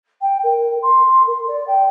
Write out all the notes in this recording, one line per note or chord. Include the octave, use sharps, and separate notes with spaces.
G5
A#4
C6
A#4
D5
G5